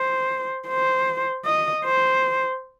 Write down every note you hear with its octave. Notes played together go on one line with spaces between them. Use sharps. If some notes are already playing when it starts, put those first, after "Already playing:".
Already playing: C5
C5
D#5
C5